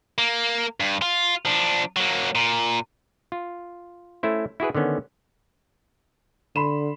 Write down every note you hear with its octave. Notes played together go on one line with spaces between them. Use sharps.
A#3
G2
F4
F3 D4
F#3 A#3
A#2
F4
A3 C#4 E4 C5
E4 F#4 G#4 B4
D3 D#3 B3 C#4
D3 B5 C6 E7